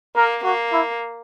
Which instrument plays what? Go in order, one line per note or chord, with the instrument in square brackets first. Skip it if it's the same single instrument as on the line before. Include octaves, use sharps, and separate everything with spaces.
[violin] A#3 [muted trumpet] A#4
[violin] A#3 [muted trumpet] F#4
[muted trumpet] E4